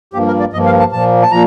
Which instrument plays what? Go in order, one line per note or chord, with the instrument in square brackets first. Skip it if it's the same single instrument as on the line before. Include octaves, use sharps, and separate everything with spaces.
[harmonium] G2 F3 A#3 G4
A#4
D5
G2 F3 A#3 D#5
F5
A5
A#2 F3 A#3 A5
A5
A#2 F3 A#5